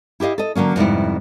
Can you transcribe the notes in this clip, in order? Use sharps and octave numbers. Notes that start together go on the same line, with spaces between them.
E4 G4 B4 D#5 F5
A4 D#5
D3 F#3 A#3 C#4
F2 G#2 C3 G3 B3 E4